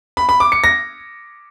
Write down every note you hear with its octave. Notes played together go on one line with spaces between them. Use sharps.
B5
B5
D6
C#7
A#6